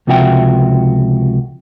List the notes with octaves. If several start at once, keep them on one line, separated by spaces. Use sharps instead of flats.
C#2 C3 F3 F#4 E5 G5